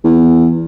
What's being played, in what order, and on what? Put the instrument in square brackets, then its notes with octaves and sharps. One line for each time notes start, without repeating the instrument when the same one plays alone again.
[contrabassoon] E2